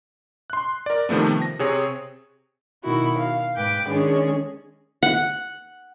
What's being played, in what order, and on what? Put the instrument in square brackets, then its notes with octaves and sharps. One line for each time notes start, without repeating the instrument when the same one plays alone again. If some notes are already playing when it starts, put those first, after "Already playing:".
[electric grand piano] C6 F#6
A#4 D5
C3 D#3 F3 A3 B3
A#6
C3 C4 G#4 C#5
[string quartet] B2 D#3 E4 F#4
F5
G#2 B4 G5 D6 F#6
D#3 G#3 C#4 D4 G#4
[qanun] F#5